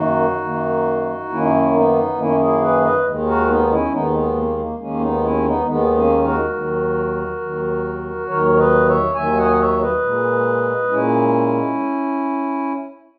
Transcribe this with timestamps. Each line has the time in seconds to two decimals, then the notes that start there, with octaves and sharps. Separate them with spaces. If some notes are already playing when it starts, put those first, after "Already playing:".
Already playing: F#2 D#3 A#3 D#4 F#4
0.43 F#2 D#3 A#3
1.30 F#2 D#3 A#3 C#4 E4
1.73 B3 D#4
2.17 F#2 D#3 A#3 C#4 E4
2.39 E4 G#4
2.61 G#4 B4
2.82 B4 D#5
3.05 D#2 D#3 G#3
3.26 F#4 A#4
3.48 B3 D#4
3.70 C#4 E4
3.92 D#2 D#3 G#3 B3 D#4
4.13 B3
4.35 A#3
4.57 A#3
4.79 D#2 D#3 G#3 A#3 C#4
5.00 B3 D#4
5.23 C#4 E4
5.44 B3 D#4
5.66 D#2 D#3 G#3 B3
5.95 A#3 C#4
6.24 F#4 A#4
6.53 D#2 D#3 F#3
7.41 D#2 D#3 F#3
8.27 D#2 D#3 F#3 A#4 C#5
8.57 B4 D#5
8.86 C#5 E5
9.15 D#2 D#3 F#3 E5 G#5
9.37 D#5 F#5
9.45 G#5
9.51 F#5
9.58 C#5 E5
9.80 B4 D#5
10.02 A#2 G#3
10.89 A#2 G#3 C#4 E4